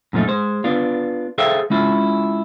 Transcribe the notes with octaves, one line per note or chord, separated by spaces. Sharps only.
F#2 A#2 F3 A3 D#4
G#3 C5
B3 D4 F4
G#4 A4 C5 E5 F5 G5
G#3 C#4 E4 F4